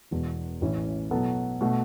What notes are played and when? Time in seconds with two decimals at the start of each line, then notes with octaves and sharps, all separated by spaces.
0.11 E1 E2 B2
0.61 A1 A2 E3 C#4
1.11 B2 F#3 B3 A4
1.61 B2 A3 F#4